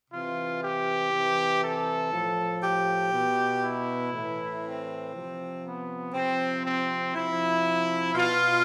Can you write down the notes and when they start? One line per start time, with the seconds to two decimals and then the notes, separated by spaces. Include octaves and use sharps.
0.11 C3 E3 F4
0.61 G4
1.11 C3 E3
1.62 A4
2.13 A2 F3
2.62 G4
3.13 B2
3.63 E4
4.13 A2 E3
4.63 C4
5.14 C3 F3
5.64 B3
6.14 C3 F3 C4
6.64 C4
7.14 C3 F3 E4
8.15 B2 F4